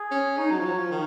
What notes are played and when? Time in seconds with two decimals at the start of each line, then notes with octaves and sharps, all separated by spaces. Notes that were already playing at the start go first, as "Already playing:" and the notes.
Already playing: G#4
0.11 C#4
0.38 D#4 C#5
0.51 F#3
0.59 F3
0.65 F#3
0.78 F3
0.91 D#3